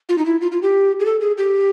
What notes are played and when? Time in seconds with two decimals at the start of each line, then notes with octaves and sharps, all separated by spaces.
0.09 F4
0.18 D#4
0.25 E4
0.41 F4
0.52 F4
0.62 G4
1.00 G#4
1.05 A4
1.21 G#4
1.38 G4